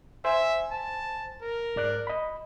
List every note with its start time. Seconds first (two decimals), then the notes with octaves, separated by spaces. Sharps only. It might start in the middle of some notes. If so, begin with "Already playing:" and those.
0.25 C5 E5 G#5
0.71 A5
1.42 A#4
1.76 G#2 D5 F#6
2.07 D#5 B5